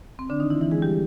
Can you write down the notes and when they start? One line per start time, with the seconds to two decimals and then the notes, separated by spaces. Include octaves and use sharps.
0.19 C4
0.30 D3 D4
0.40 D#3 D#4
0.50 E3 E4
0.61 E3 E4
0.71 G#3 G#4
0.82 G3 G4